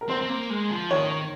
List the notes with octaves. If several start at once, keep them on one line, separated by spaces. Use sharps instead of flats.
A#4
C4 C5
C4
A#3
G#3
F3
D#3 C#5